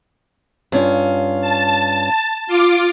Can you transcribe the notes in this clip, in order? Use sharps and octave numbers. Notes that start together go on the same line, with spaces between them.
G2 C#4 F4
A5
F4 D6